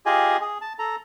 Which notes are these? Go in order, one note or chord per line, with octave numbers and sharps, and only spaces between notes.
F4 G4 G#4 D#5 G#5
G#4
A5
A4 A#5